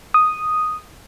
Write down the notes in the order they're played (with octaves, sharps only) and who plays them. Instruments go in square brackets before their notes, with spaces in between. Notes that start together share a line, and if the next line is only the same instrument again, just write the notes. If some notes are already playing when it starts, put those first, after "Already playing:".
[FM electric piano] D#6